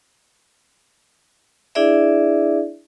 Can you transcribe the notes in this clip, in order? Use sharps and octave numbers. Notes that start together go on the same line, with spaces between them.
D4 E4 G#4 D5 E5